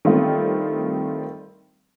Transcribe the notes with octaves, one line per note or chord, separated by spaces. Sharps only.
D#3 G3 A3 C4 D4 F4